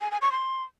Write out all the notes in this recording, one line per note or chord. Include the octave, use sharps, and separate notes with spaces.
G#5
G#5
C#6
C6